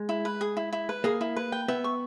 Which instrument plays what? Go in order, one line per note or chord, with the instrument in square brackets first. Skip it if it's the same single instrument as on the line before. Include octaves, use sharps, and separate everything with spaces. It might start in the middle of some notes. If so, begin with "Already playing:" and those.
Already playing: [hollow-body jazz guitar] G#3
[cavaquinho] E4
B4
G#4
E4
E4
B4
[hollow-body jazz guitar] A#3 [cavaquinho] G#4
[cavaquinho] E4
B4
G5
[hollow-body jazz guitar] B3 [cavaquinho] E5
[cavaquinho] C#6